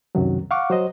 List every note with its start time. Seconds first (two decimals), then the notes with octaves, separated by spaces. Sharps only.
0.15 C2 F#2 D#3 F#3
0.51 F5 F#5 C#6 D6
0.70 F#3 C5 D#5